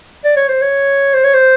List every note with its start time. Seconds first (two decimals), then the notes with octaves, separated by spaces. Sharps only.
0.25 D5
0.36 C#5
0.49 C5
0.62 C#5
1.14 C5
1.24 C#5
1.34 C5